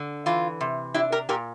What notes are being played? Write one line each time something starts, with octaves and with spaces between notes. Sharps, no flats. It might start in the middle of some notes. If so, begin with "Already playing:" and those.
Already playing: D3
E3 F4
C3
D4 E4 G4
G4 A#4
A#2 G4 A#4